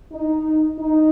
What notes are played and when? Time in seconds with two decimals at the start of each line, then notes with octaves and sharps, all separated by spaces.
0.12 D#4
0.79 D#4